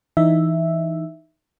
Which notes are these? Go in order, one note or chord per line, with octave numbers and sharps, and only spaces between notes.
E3 D#4 E5